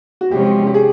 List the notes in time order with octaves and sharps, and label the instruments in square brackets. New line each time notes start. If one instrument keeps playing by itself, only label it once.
[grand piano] F#4
[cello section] E2 C3 F3 G#3 C#4 [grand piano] G4
[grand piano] G4
G#4